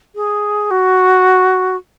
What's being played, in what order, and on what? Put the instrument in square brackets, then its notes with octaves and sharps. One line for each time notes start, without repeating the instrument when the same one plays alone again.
[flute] G#4
F#4